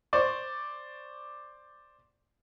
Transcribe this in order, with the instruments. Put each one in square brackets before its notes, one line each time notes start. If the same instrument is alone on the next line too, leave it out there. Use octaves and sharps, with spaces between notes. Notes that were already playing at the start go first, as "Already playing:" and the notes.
[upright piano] C5 D5 C#6 D6